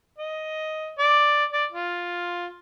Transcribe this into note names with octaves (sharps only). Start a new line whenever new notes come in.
D#5
D5
D5
F4